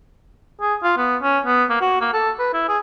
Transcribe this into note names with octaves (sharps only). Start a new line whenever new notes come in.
G#4
F4
B3
C#4
B3
A#3
F#4
A#3
A4
B4
E4
G#4